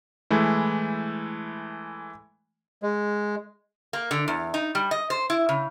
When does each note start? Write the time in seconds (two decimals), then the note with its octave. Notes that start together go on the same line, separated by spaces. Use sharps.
0.30 E3 G#3 A3 E4
2.83 G#3
3.93 A#3
4.11 D3
4.28 E2
4.54 D#4
4.75 G3
4.91 D#5
5.10 C5
5.30 E4
5.49 C#3